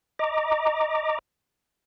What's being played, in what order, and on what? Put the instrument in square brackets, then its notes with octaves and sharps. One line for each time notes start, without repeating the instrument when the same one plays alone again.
[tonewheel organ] D#5 A#5 D6